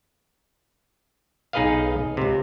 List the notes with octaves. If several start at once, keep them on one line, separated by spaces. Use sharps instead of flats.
B1 D#4 G#4 B4 D#5 F5
C#2 C3